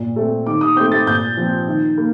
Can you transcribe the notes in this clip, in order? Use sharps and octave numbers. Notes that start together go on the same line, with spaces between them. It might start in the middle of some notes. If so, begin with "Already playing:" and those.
Already playing: A#2
A3 C4
D#3 D6
D#6
A3 C4 G6
A6
A#2 G6
F3 C4
D#3
A#3